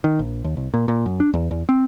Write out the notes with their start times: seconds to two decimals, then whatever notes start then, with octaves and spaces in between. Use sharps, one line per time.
0.04 D#3
0.19 A#1
0.44 D#2
0.57 C2
0.74 A#2
0.88 A#2
1.06 F#2
1.20 D4
1.34 E2
1.51 E2
1.69 C4